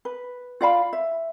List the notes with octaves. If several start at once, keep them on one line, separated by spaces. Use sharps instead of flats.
B4
F4 D5 F5 B5
E5